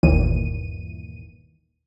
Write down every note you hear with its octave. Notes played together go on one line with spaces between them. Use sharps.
G1 D#2 A#2 D#3 E3 D#7